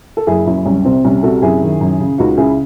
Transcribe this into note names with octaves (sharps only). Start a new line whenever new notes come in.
A4
F#1 E4 G#4
F#2 C#4 E4
C2 C#4
C3 C4
C2 C#4
C3 F#4 A4
F#2 E4 G#4
D#3
F#2
C#3
C#2 D#4 F#4
C#3 E4 G#4